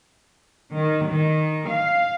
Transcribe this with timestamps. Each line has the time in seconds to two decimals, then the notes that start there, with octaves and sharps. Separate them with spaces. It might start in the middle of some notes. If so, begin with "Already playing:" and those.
0.75 D#3
1.07 D#3
1.69 F5